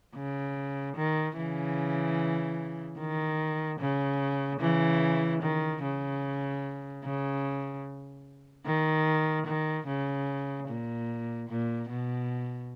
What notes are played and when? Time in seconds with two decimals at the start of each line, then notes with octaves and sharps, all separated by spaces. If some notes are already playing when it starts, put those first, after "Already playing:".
0.16 C#3
0.96 D#3
1.37 C#3 E3
2.98 D#3
3.80 C#3
4.60 C#3 E3
5.42 D#3
5.83 C#3
7.04 C#3
8.65 D#3
9.46 D#3
9.87 C#3
10.68 A#2
11.49 A#2
11.89 B2